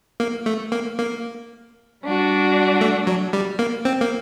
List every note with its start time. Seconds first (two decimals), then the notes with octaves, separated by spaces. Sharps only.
0.20 A#3
0.46 A3
0.72 A#3
0.99 A#3
2.03 G3 D4 F#4
2.81 A3
3.07 F#3
3.33 G3
3.59 A#3
3.85 C4
4.01 A#3